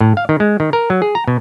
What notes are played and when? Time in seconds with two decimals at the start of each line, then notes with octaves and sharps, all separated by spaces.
0.01 A2
0.17 F5
0.29 D#3
0.40 G#3
0.60 D#3
0.73 A#4
0.90 F#3
1.02 G#4
1.15 A#5
1.28 B2